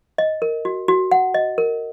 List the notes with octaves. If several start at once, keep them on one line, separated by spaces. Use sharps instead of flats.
D#5
A#4
F#4
F#4
F#5
D#5
A#4